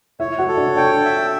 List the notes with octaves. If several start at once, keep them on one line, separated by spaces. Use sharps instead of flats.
E4 C#5 E5
F#4 F#5
A4
D4 D5
D4 D5 G5
E5